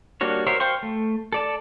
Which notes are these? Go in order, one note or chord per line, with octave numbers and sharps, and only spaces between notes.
G3 A#3 D4 F#4 C#5
F#4 A#4 C5 C#5 E5
C5 F5 G5 C6 C#6
A3
A4 D5 A5